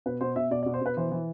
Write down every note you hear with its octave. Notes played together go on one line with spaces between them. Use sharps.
B2 B4
B2 C5
B2 E5
B2 D5
D5
B2
C5
B2 B4
E3 C5
E3